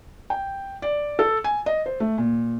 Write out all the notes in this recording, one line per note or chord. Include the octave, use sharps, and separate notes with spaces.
G5
D5
A4
G#5
D#5
C5
A3
A#2